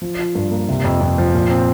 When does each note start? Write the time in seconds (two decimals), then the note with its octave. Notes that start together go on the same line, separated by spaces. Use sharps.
0.02 F3
0.19 F4
0.35 G2
0.51 A#3
0.69 C3
0.84 F2
1.01 F2
1.18 F3
1.34 A#2
1.50 C4